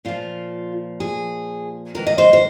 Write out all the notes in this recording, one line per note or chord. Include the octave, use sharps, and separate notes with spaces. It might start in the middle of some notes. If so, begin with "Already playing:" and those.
A#2 F3 F4
G#4
G#2 D#3 A#4
D#5
C5
C5